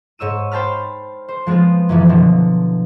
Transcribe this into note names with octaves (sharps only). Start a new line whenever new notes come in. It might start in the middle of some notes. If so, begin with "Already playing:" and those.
G#2 C#5 E6 D#7
C5 G5 A5 B5 F6
C5
F3 G#3 B3 C4 F4
F#2 E3 F3
B2 D3 F3 F#3